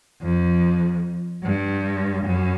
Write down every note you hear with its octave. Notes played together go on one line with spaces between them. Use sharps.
F2
G2
F#2